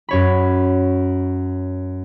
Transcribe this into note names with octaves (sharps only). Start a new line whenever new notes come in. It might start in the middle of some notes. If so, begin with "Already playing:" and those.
F#2 C#5 B5